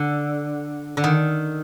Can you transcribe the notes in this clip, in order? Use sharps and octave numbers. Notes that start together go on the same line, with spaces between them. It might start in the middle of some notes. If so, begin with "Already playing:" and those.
Already playing: D3
D3
D#3